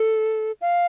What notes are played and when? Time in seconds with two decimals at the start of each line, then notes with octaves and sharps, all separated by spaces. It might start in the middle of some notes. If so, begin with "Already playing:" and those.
Already playing: A4
0.61 F5